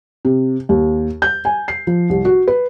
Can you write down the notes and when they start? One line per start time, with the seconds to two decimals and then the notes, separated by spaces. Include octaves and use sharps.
0.25 C3
0.69 D#2
1.22 G6
1.45 G#5
1.68 C7
1.87 F3
2.10 C2
2.25 F#4
2.48 B4